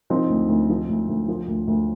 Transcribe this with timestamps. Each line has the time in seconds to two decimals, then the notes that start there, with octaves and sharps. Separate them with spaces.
0.10 F3 C4 D#4
0.30 D2
0.49 D2
0.70 F3
0.89 D2
1.08 D2
1.28 F3
1.48 D2
1.67 D2